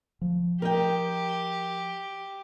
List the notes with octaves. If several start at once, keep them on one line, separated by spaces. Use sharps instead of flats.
F3
G4 A#4 D#5 G5